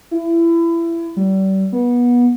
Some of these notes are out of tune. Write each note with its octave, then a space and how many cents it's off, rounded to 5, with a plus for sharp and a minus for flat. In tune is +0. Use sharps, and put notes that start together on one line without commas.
E4 +25
G3 -35
B3 -25